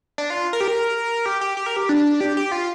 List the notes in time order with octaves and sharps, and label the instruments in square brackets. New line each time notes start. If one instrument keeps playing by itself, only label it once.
[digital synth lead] D4
F4
A#4
G4
A#4
G4
G4
G4
A#4
G4
D4
G4
G4
F4